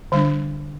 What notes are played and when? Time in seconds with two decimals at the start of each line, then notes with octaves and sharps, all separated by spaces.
0.12 D3 G3 D4